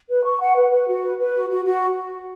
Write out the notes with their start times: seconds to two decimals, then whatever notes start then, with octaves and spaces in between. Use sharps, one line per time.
0.09 B4
0.24 C#6
0.40 F#5
0.56 B4
0.71 B4
0.87 F#4
1.03 B4
1.18 B4
1.34 F#4
1.49 F#4
1.65 F#4